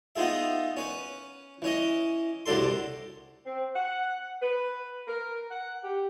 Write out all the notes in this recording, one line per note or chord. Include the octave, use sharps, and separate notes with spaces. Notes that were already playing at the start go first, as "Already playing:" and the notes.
B3 D#4 F4 G#4 E5
C#4 B4
E3 C#4 D#5
C2 F#2 D4 A4 C6
C4
F#5
B4
A#4
F#5
G4